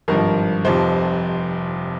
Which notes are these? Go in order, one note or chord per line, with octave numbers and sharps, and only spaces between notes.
G#1 G2 F3 A#4
F1 F2 C3 F3 C5